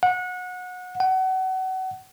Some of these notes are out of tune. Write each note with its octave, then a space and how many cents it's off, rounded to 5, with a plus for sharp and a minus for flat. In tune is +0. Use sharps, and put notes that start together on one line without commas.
F#5 -25
F#5 +30